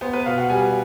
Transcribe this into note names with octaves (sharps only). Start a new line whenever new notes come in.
B3 C5
B4
B2 F5
F#5
G3 G#5